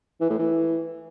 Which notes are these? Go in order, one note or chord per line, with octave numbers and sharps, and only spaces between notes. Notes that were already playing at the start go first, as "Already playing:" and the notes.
E3
A2
E3